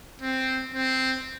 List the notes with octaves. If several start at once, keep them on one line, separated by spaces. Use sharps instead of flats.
C4
C4